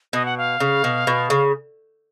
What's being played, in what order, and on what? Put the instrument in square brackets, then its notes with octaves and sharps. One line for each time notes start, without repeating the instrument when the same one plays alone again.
[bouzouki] B2 [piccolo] D#5
[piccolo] F#5
F5
[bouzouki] C#3
B2
B2
C#3